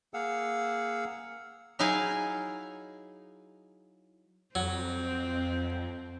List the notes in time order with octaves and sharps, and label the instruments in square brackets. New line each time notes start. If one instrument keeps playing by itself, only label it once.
[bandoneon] A#3 G#4 F5 F#5 E6
[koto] F#3 D#4 E4 G#4 F5 G#5
[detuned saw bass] F2 [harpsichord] F#3 [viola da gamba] C4